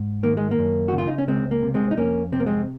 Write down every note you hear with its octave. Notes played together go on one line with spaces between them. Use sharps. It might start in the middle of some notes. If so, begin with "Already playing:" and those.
Already playing: G#2
D#3 A#3
G#3
A#3
F#2
F#4
C#3
F4
D#4
C#4
C#2 G#3 C4
A#3
C3
G#3 C4
D#4
F2 A#3 C#4
C3 C4
A#3
G#3 C4